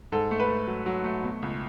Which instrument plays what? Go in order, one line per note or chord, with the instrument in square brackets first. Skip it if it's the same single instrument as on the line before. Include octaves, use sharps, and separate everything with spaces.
[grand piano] G#2 A4
A3
B4
A3
F#3
F#3
A3
B2
C#2